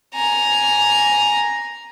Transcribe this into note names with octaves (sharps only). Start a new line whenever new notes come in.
G#5 A#5